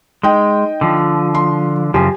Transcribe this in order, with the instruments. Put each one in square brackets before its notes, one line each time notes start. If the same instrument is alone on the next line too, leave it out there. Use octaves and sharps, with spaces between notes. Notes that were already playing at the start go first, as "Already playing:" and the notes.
[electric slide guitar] G#3 [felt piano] D#4 D#5 G5
[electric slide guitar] D3 F3
[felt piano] C6
[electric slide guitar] F#2 C#3 F3 [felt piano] G4 G#5